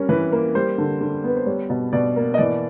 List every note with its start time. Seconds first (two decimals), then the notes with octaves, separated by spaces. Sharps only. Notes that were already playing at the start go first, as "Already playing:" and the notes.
Already playing: G3 C#4 A#4
0.09 E3 B4
0.32 A#3
0.55 G3 C5
0.78 D3
1.01 D3
1.24 B3 B4
1.37 C5
1.46 G3 C#5
1.70 B2
1.93 B2 D5
2.16 A#3
2.34 D#5
2.38 E3 D5